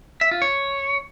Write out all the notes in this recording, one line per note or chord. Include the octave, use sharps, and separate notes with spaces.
E5
F4
C#5